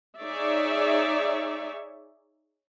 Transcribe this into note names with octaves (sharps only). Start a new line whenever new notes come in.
D#4 G#4 C#5 D5 E5